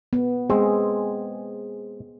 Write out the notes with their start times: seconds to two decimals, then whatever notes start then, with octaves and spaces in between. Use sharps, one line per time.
0.13 B3
0.50 G#3 C4 G#4